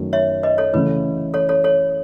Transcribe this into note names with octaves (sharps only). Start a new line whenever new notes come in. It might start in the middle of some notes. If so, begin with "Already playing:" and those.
Already playing: F#2 D#3 F#3 A3
C#5 E5
B4 D#5
A4 C#5
C#3 E3 A3 E4 B4
A4 C#5
A4 C#5
A4 C#5